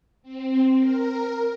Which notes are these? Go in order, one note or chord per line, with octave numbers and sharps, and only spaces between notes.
C4
A#4